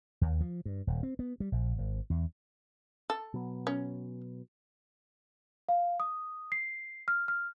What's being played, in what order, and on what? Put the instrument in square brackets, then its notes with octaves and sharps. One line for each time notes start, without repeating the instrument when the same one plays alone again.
[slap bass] D#2
F3
G2
D#1
C4
B3
G3
A#1
G#1
E2
[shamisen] A4
[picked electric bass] B2 F#3 B3
[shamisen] C#4
[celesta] F5
D#6
C7
F6
F6